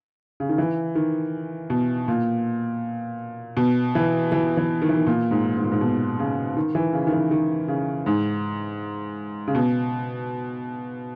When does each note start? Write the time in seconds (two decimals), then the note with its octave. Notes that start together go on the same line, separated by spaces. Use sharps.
0.40 C#3
0.49 D#3
0.58 E3
0.95 D#3
1.70 B2
2.08 A#2
3.57 B2
3.95 E3
4.32 E3
4.57 E3
4.82 D#3
4.89 E3
4.96 D#3
5.07 A#2
5.31 G#2
5.57 G#2
5.64 A#2
5.72 G#2
5.81 B2
6.19 C#3
6.57 D#3
6.75 E3
6.93 C#3
7.07 D#3
7.12 E3
7.31 D#3
7.68 C#3
8.06 G#2
9.48 C#3
9.55 B2